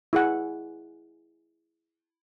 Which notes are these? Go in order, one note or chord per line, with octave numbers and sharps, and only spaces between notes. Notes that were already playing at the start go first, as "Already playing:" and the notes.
E4 G#4 F#5